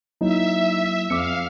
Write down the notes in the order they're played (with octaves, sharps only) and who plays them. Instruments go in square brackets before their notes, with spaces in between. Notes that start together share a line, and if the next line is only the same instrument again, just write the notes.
[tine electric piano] F#3 A#3 E4 [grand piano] D#4 [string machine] E5
[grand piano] F2 [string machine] F5 [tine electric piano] D6 E6 C#7